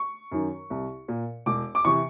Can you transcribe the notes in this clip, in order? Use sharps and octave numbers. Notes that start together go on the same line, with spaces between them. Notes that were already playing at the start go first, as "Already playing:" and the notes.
Already playing: C#6
F#2 D#3
C2
A#2
E1 D6
D6
C3 E3 C#6